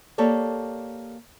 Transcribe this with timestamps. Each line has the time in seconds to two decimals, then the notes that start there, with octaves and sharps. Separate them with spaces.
0.18 A#3 G4 A4 C#5 D5